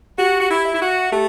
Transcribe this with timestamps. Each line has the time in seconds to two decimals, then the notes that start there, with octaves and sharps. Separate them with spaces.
0.18 F#4 G4
0.40 F#4
0.50 E4
0.65 E5
0.75 E4
0.81 F#4
1.12 A3 G4